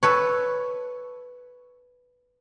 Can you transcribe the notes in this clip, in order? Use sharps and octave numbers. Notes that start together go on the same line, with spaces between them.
A4 B4 C#5